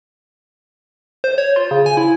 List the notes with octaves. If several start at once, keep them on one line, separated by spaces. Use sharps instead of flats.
C5
C#5
F4
C#3
G#5
E4